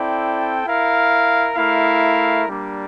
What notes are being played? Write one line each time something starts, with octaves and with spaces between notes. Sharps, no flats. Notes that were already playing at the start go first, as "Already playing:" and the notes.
Already playing: C4 E4 A4 D5 G5
E4 A#4 F5
A3 E4 A#4 F5
G3 A#3 D4